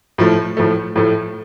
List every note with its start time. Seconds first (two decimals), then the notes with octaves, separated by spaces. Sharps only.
0.18 A2 F3 A3
0.57 A2 F3 A3
0.96 A2 F3 A3